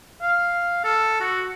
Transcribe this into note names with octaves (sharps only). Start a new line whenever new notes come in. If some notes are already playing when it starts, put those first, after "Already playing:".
F5
A4
F#4